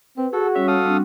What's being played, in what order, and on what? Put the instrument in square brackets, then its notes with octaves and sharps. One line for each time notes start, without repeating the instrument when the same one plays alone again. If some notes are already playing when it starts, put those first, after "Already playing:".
[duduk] C4 [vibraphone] B4
[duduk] F#4 [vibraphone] G#4 F#5 [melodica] A4
[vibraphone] G3 C#4 C#5 [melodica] E5
[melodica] A4 F5 D#6
[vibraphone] G3 C4 D4